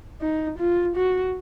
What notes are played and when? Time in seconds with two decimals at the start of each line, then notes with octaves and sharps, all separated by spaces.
0.21 D#4
0.59 F4
0.96 F#4